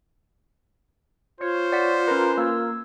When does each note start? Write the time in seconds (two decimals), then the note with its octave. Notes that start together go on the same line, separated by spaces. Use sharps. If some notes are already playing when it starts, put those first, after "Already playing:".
1.41 F4 C5 C#5
1.72 D5 F#5 B6
2.08 C#4 A#4 B4
2.38 A#3 E6 G#6